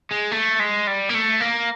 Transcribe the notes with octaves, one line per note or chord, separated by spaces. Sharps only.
G#3
A3
G#3
G3
A#3
A3
A#3